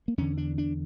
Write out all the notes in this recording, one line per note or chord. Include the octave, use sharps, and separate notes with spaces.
A#3
E2 D3 C#4
D4
D4